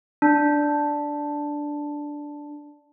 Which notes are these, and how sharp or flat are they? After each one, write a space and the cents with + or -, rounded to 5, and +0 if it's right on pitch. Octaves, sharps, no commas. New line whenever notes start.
D4 +0